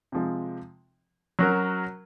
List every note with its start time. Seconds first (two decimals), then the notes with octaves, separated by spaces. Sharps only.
0.12 C3 F3 G#3
1.39 F#3 C#4 F#4 A#4